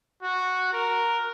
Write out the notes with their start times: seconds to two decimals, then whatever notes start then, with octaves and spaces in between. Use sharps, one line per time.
0.22 F#4
0.73 A#4